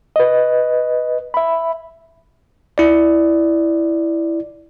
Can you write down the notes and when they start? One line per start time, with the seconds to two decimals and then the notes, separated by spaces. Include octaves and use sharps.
0.16 B4 D#5
1.34 E5 B5
2.78 E4 D5